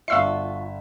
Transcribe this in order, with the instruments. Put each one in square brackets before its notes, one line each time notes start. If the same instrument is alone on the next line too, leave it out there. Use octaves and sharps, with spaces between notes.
[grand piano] G1 E5 [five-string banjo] F4 F#4 A4 [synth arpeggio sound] F5 E6 C7